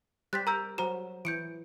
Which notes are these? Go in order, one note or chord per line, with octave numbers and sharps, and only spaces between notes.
G3 G4 C5 F#6 A6 B6
A#4 A#5 E6 G6
F#3 F#4 C5 A#5 E7
E3 G6 C#7 D7